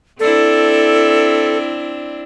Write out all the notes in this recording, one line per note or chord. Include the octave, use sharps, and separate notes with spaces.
C4 D4 E4 A4